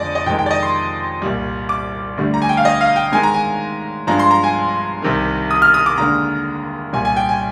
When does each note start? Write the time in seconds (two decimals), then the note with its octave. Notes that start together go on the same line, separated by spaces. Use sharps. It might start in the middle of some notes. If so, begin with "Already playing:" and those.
Already playing: F2 D3 G#3 D5 D#5
0.15 D#5
0.26 F2 C3 D#3 G#3 G5
0.39 G5
0.46 D5
0.51 D#5
0.63 C6
1.22 C2 A#2 G3
1.69 D6
2.18 D2 D3 G3
2.34 A#5
2.42 G#5
2.49 G5
2.57 F5
2.65 D#5
2.81 F5
2.96 G5
3.12 G#2 D#3 G#3 G#5
3.23 A#5
3.34 G#5
4.07 G2 F3 G#3 A#5
4.19 C6
4.31 A#5
4.44 G#5
5.02 C2 C3 D#3
5.51 D#6
5.62 F6
5.74 D#6
5.86 D6
5.98 D#2 D3 G#3 A#5
6.93 C2 A#2 G3 G#5
7.05 G#5
7.16 G5
7.29 G#5